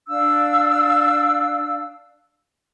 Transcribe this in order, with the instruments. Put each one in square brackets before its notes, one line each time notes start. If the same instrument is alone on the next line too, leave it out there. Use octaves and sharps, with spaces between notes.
[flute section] D4 F5 E6